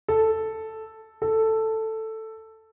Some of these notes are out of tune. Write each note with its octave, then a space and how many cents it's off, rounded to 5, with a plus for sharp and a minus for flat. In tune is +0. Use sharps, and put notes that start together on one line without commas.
A4 +0
A4 +5